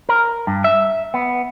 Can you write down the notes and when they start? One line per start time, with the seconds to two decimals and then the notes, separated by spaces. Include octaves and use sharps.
0.09 A#4
0.47 G2
0.64 E5
1.14 B3